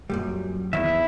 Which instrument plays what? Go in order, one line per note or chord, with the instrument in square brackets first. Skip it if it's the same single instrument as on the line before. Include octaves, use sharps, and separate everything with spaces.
[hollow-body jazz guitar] F#2 A#2 G3
[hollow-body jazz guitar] E2 D#3 [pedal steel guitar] E4 E5